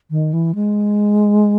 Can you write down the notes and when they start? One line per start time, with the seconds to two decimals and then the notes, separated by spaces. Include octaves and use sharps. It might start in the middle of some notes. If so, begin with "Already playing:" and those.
0.11 D#3
0.33 E3
0.55 G#3